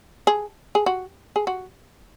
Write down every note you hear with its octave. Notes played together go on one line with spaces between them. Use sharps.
G#4
G#4
F#4
G#4
F#4